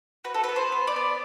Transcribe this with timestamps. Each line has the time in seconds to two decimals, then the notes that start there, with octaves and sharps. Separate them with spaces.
0.24 F#4 B4
0.34 A4
0.44 B4
0.49 B3
0.56 C5
0.72 B3
0.87 D5
0.96 B3